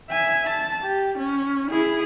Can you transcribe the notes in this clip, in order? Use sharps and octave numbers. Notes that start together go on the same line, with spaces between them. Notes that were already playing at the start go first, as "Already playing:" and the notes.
E5 G#5
A5
G4
C#4
E4 G#4